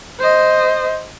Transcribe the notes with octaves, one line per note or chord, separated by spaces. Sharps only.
C5 D#5